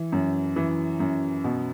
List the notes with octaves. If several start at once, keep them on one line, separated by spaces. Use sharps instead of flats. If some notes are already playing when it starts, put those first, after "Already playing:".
Already playing: E3
F#2
E3
F#2
B2